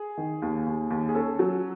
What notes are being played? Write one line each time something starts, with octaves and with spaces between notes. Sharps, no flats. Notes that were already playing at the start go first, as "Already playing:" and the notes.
Already playing: G#4
D#3
D#2
D#2
D#2
G#4
C#4 A4
F#3